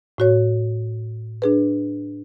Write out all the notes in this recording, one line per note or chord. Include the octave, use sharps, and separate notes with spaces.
A2 F#4 C#5
D4 G#4 B4